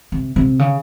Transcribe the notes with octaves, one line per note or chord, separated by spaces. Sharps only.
C3
C3
C#3